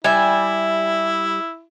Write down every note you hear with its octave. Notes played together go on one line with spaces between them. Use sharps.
G3 E4 E5 G#5